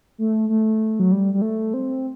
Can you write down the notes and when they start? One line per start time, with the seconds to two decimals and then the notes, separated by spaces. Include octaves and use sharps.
0.18 A3
0.49 A3
0.99 F#3
1.12 G3
1.34 G3
1.42 A3
1.74 C4